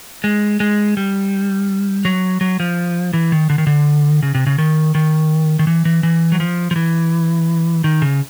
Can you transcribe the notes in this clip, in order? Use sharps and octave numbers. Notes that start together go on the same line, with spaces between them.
G#3
G#3
G3
F#3
F#3
F3
E3
D#3
D3
D#3
D3
C#3
C3
C#3
D#3
D#3
D#3
E3
E3
E3
F#3
F3
F3
E3
D#3
C#3